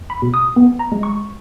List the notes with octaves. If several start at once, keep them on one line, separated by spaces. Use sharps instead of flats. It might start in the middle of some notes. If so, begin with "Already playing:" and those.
Already playing: E2
B5
B2
D#6
B3
A#5
G#3
C#6